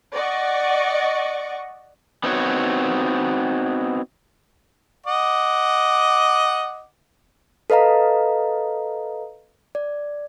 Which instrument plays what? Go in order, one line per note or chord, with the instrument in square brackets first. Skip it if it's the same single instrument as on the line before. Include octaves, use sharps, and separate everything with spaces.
[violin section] D5 D#5 F#5 C#6
[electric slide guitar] B3 C4 D#4 F#4 C#5
[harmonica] D#5 F#5 D6
[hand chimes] A4 B4 D#5 F5 A#5
D5